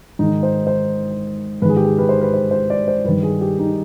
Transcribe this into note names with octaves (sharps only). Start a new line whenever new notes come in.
G#2 D#3 D#4
C5
C5
G#2 D#3 G#4 B4
G4
G#4
B4
C5
B4
C5
C5
D5
C5
G2 D#3 B4
G#4
G4
D#4